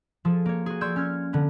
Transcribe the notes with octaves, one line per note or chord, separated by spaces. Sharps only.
F3 G#4 A4
A#3 C#5
F#4 G#4
D5 C6 C#6 E6 G6 G#6
C#4 F6 G#6
D3 B3